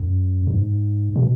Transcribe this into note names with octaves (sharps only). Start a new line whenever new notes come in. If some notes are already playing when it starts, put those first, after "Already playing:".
Already playing: F#2
F#2
G#2
B2